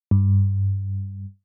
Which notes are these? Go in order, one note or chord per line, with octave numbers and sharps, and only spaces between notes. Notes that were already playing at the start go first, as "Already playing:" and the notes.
G2